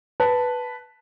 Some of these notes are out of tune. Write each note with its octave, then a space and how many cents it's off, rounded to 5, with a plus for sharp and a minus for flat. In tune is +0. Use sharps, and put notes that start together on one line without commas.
B4 +0 A5 +0